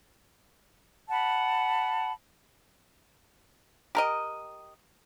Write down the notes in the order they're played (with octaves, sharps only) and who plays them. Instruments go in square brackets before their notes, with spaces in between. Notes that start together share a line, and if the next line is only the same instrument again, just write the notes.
[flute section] F#5 A5 B5
[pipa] G4 A#4 D#5